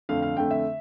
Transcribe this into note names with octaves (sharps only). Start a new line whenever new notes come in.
F2 D3 A3 F5
F5
F2 D3 A3 G5
E5